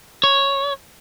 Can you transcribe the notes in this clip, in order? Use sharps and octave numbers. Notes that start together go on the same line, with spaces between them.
C#5